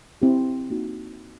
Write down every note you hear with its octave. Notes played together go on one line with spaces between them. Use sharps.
C4 E4 G4
A#3 D#4 F#4